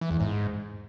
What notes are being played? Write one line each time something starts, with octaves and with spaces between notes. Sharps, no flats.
E3
E2
G#2